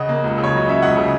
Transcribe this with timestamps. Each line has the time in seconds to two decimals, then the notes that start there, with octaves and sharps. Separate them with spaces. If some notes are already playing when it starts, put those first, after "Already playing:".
Already playing: C#3 D#5 F#5
0.09 A#3
0.24 C#2
0.38 C#3
0.44 C#5
0.53 F#3 D#5
0.67 C#4 E5
0.82 C#2 D#5 F#5
0.97 C#3